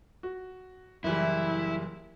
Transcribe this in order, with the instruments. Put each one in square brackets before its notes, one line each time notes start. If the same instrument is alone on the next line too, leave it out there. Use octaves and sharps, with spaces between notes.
[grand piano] F#4
[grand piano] F#1 E3 G3 [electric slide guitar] E4